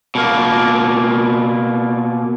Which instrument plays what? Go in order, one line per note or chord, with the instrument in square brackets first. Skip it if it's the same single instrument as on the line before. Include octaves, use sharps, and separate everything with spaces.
[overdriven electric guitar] B2 A#3